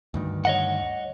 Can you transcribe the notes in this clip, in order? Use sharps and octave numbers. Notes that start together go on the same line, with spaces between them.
D2 G2 D#3
C#5 D#5 F#5